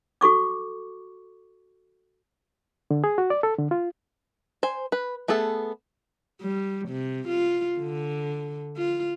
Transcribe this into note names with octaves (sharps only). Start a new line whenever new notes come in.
F#4 A4 C#6 D6
D3
G#4
F#4
D5
A4
D3
F4
C5 G#5
B4
A3 B3 G#4 A4
G3
C3
F4
D3
F4